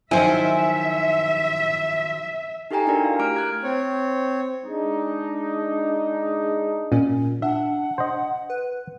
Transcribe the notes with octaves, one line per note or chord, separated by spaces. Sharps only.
D#3 F3 F#3 E4 C5 E5 G#5
D#4 G4 A4 G5 G#5 A#5
D4 E4 F#4 G4 A#4 D5
F5
A3 A#5 D6 F6 D7
F#6 G#6
C4 C#5
G#3 D4 D#4
A#2 C#4
D4 E5 F#5
C5 D#5
B4